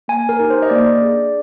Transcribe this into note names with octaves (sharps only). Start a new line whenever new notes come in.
A#3 G#5
A#4
D#4 G4
C5
D#5
A#3 D5
D4 G#4